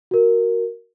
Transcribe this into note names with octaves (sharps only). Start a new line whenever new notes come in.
F#4 A#4